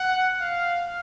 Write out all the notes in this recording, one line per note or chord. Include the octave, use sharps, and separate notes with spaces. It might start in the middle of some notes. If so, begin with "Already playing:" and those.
Already playing: F#5
F5